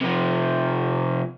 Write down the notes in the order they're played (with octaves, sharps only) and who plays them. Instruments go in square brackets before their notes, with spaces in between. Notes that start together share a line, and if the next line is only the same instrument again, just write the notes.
[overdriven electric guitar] C3 F3